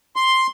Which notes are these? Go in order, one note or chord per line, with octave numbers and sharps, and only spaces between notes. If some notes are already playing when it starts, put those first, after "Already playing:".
C6